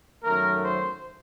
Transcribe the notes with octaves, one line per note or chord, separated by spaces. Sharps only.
F#2 D#3 A3 A#4
C5